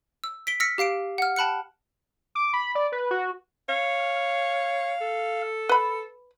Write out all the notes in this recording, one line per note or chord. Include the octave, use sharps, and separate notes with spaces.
E6
B6 D7 G7
E6 F6 A#6 B6 C#7
G4 F5 C7 D7
F#5 F6
G5 A5 B5 F#6 C#7
D6
B5
D5
B4
F#4
C#5 F5
A4
B4 B5